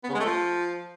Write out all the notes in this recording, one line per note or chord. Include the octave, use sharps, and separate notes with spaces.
B3
C#3
G#3
A3
F3